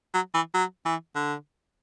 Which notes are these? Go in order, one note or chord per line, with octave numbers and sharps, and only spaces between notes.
F#3
E3
F#3
E3
D3